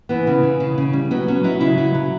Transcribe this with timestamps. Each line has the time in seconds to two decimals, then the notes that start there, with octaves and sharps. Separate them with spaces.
0.09 E3 B3
0.27 C#3
0.43 E3
0.60 C#3
0.78 C#3
0.93 G3
1.11 F#3 B3
1.28 F#3 C#4
1.44 F#3 E4
1.61 C#3 E4
1.78 F#3
1.94 F#3